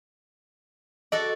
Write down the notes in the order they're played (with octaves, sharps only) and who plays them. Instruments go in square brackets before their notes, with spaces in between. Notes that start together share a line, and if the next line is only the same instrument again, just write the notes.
[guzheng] F#4 A4 D5 [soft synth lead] D#5